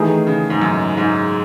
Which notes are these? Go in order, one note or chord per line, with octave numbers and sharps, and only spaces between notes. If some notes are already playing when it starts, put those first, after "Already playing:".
Already playing: D#3 E3 A3 D#4 G#4
C#3
G#2
F#2
G#2